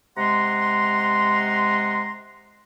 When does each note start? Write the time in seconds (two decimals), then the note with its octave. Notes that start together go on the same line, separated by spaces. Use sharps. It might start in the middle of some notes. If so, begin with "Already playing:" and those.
0.18 C3 G#3 F#5 A#5 C6